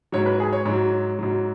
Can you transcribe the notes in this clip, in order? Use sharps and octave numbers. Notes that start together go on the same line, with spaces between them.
G#2 F#3 C#5
B4
G#4
C#5
G#2 F#3
G#2 F#3